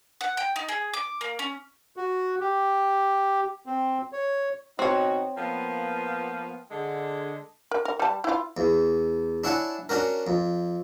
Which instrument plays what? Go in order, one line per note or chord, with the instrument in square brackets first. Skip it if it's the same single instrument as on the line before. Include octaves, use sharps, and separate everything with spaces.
[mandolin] F#5
G5
D#4
G#4
D6
A#3
C#4
[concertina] F#4
G4
C4
C#5
[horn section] B2 D#4 F#4 [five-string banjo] C4 C#5
[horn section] F3 A#3 B3
D3 G#3
[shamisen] A#4
A#4
G3 A5
E4 F4
[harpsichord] E2
D4 E4 C#5 F#5 G#5 A5
C#4 D4 F#4 A#4
F2